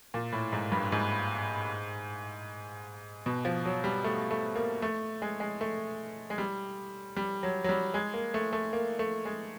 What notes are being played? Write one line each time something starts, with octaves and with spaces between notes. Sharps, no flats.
A#2
A2
G#2
G2
G#2
B2
F3
F#3
G3
A3
A3
A#3
A3
G#3
G#3
A3
G#3
G3
G3
F#3
F#3
G3
G#3
A#3
A3
A3
A#3
A3
G#3